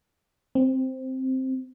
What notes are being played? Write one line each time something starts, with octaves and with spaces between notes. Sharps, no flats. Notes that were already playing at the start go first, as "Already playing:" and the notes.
C4